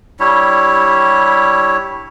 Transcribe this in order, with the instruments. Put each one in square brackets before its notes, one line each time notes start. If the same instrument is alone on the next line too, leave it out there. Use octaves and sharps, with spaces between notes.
[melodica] G3 D4 E4 C#5